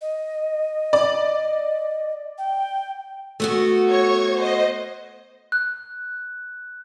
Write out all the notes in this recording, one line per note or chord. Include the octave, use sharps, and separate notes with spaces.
D#5
D5
G5
A3 B3 F#4
C#5 C#6 G#6
C5 D#5
F#6